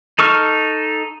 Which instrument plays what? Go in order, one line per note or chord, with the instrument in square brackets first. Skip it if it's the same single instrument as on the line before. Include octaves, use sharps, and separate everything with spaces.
[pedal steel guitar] D#4 A4 C#6 F6